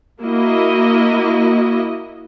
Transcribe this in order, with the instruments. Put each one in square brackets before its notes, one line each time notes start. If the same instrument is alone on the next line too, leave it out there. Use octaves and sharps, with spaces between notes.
[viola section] A#3 E4 F#4 D#5